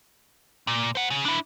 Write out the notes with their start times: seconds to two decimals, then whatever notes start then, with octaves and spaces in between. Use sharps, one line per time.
0.67 A#2
0.95 C5 F#5
1.10 C#3
1.25 D4 E4